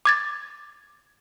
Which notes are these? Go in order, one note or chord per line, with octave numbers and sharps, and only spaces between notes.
D6 G#6 A6